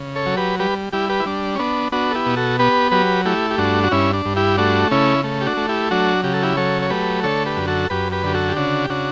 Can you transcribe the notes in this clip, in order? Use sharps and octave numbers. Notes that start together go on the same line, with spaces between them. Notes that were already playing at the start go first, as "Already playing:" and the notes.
Already playing: C#3
A4 C#5
F#3
G4 B4
G3 G4 B4
G3 E4 G4
G4 B4
E4
G3 D4
C#4
B3 D4
B3 D4 F#4
A4
E4 G4
B2
F#4 A4
B3 G4 B4
F#3 G4 B4
A3 E4 G4
G4
G2 D4 F#4
F#4
G2 C#4 E4
D4
G2
E4 G4
A3 D4 F#4
C#3 C#4 E4
A3
G4
D4 F#4
A3
E4 G4
F#3 D4 F#4
C#3 G4
A4
E4 G4
F#3 A4 C#5
C#5
A3 G4 B4
D3 A4 C#5
G4 B4
F#2
F#4 A4
F#2 G4 B4
G4 B4
D3 G4
F#4 A4
G4
C#3 D4 F#4
G4
C#3 D4 F#4